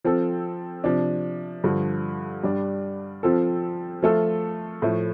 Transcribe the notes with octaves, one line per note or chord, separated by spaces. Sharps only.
F3 C4 F4 A4
C3 F3 D4
G2 D3 F3
G2 G3 D4
F3 C4 F4 A4
F3 A3 F4 A4
A2 F3 A3